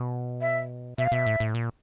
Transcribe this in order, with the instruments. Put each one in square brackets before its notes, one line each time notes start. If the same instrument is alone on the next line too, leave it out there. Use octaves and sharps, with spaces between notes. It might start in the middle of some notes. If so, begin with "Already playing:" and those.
Already playing: [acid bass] B2
[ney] E5
[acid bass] B2 [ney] E5
[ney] F5
[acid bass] B2 [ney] E5
[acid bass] A2
A2
A#2